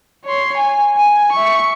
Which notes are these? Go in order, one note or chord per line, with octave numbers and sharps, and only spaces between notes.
C#5 C6
G#5
G#5
E5 C#6